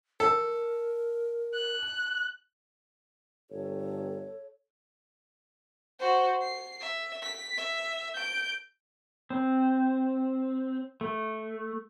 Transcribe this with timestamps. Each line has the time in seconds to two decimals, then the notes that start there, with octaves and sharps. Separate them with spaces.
0.20 A4 A#4
1.54 F#6
3.50 G1 A4 C#5
6.00 F#4 C5
6.42 C7
6.81 E5
7.23 B6
7.58 E5
8.15 G6 D7
9.30 C4
11.01 A3